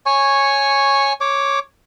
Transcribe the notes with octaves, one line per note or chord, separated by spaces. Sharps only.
C#5 G#5 C#6
C#5 D6